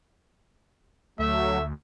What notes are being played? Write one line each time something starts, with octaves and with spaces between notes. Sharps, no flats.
D2 F#3 A3 E5